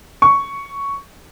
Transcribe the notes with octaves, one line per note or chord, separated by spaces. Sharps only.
C#6